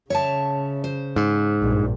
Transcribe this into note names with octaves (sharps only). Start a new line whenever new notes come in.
C#3 C#5 E5 A5
C5
G#2
A#1 G2